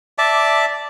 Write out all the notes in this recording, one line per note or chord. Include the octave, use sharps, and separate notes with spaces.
D5 E5 A5 D6